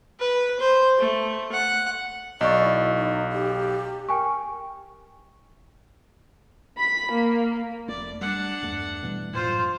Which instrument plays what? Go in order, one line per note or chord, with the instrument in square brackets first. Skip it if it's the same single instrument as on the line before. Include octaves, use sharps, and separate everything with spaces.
[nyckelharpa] B4
C5
A3
F#5
[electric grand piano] B1 [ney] D5 [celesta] D#5 C#6
[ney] E4
D#4
G4
[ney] A#4 [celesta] G5 G#5 C#6
[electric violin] B5 B6
A#3
[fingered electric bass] F1 A3 [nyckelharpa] D5
[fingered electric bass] G3 [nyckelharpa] D4 F#5
[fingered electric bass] E2 G2 A3
B2 E3 G3
[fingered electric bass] F#2 A2 [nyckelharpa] F4 C5